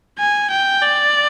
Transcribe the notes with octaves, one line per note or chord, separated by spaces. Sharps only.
G#5
G5
D5